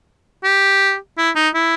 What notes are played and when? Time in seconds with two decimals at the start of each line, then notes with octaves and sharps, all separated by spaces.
0.44 G4
1.18 E4
1.36 D#4
1.54 E4